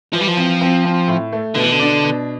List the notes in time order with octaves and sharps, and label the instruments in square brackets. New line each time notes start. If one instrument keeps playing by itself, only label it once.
[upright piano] E3 [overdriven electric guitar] F3
[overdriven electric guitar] G3
F3
[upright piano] C4
C4
C4
A2
A3
[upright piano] B2 [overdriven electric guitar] D3
[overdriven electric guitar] E3
D3
[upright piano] D4
B2